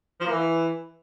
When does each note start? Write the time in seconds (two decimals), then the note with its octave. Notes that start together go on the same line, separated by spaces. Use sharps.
0.20 F3
0.25 A#3
0.31 E3